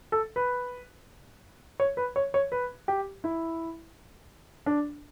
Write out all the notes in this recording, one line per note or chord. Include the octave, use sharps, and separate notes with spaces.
A4
B4
C#5
B4
C#5
C#5
B4
G4
E4
D4